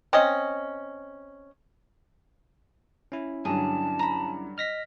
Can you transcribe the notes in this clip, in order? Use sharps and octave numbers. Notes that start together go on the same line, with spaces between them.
C4 C#4 D#5
C#4 E4
G2 D3 F#3 G#4 A5
A#5 B5
D#5 F6 A#6 B6